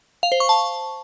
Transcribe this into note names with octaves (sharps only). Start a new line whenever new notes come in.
F5
C5
C#6
A5